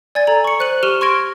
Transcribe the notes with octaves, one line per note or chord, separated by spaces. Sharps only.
D5 G#5 G#6 A6
A4 A#5 F#7
C#6 C#7
C5 F#6 D#7 F#7
G4 C#6 F6 D#7 E7 G7
C6 C#6 F6 G#6 A#6 D7